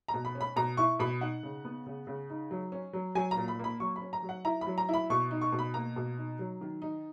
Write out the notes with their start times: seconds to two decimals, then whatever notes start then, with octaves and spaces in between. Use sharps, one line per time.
0.08 A#5
0.14 B2
0.25 B5
0.35 C#4
0.41 B5
0.56 B2 A#5
0.77 E4 C#6
0.99 B2 B5
1.21 D#4 F#5
1.43 C#3
1.65 B3
1.86 C#3
2.07 C#3
2.30 D#4
2.51 F#3
2.72 C#4
2.93 F#3
3.15 F#3 G#5
3.31 A#5
3.37 A#2
3.48 B5
3.59 A#3 B5
3.80 F#3 C#6
3.96 B5
4.01 C#4
4.13 A#5
4.23 F#3
4.29 F#5
4.45 E4 A#5
4.61 B5
4.67 F#3
4.78 A#5
4.89 E4 B5
5.10 B2 C#6
5.31 D#4
5.41 C#6
5.52 B2
5.59 B5
5.74 A#3 A#5
5.96 B2
6.18 D#4
6.39 F#3
6.61 D#3
6.82 D#4